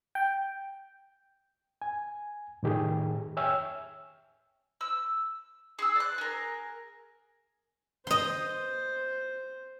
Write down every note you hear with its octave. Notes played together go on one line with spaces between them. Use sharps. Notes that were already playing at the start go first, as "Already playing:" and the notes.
G5
G#5
A2 D#3 G4 G#4
C#5 E5 G5 G#5 E6 F6
E6
G#4 E6
D5 F#6
G#4 A#4
C5 D#5 C6